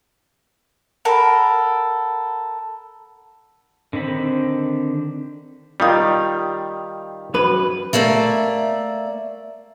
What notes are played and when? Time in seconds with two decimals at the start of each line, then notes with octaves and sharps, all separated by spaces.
1.05 A4 A#4 F#5 B5
3.93 D3 D#3 C4 B5
5.80 D#3 G3 F4 F5 D#6
7.34 F#2 B4
7.93 A3 A#3 D5 E5